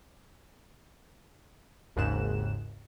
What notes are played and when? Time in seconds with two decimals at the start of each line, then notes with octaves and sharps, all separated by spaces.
1.96 G#1 D#2 G#2 C#3 F#6 E7